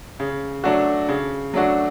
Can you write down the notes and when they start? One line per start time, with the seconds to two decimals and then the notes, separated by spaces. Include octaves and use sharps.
0.20 C#3
0.64 F#3 A3 D4 F#4
1.09 C#3
1.54 F#3 A3 D4 F#4